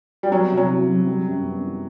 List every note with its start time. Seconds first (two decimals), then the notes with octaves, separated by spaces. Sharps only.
0.23 G3
0.31 F#3 B3
0.51 C3
0.57 F#3
0.70 E4
0.89 F#3
1.07 G3
1.26 F#2
1.45 B3
1.63 E3